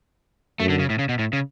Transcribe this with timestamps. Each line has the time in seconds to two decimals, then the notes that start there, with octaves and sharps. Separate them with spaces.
0.60 F#2 A3
0.69 D3
0.79 C#3
0.90 A2
0.99 C#3
1.09 B2
1.19 A2
1.33 C#3